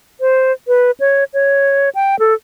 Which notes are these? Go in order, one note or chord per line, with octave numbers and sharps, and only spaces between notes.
C5
B4
C#5
C#5
G5
A4